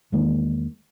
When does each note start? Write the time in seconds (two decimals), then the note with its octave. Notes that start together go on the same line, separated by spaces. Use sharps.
0.12 E2 D#3 G#3 A#3